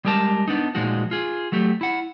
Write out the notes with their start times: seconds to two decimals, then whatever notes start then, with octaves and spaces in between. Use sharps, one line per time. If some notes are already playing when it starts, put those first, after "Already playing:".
0.05 G3 G#3 G4 A#4 A5
0.48 B3 D4 D#4
0.75 A#2 F3 G#3 D#4 F#4
1.11 F4 G#4
1.52 F#3 A3 G4
1.81 E4 F#5